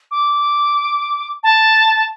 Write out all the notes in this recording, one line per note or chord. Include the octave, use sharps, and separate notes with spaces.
D6
A5